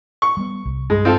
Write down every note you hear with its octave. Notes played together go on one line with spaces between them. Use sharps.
C#6
G3 B3
C2
G2 G#3
C4 F4 A4